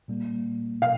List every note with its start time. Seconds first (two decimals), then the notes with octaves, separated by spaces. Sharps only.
0.08 A#2 G3 A#3
0.82 B2 F5